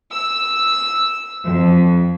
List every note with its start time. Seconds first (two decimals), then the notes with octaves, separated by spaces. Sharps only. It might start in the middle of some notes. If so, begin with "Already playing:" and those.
0.12 E6
1.45 F2